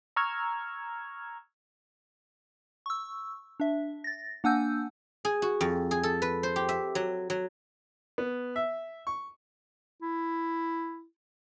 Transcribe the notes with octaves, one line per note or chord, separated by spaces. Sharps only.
A#5 C#6 E6 F6 G#6
C#6 E6
D4 E5
A6 A#6
A#3 D4 F#5 G#5 E6 G6
G#4
F#4
F2
G#4
A4
B4
C5
G4
E5
F#3
F#3
B3
E5
C#6
E4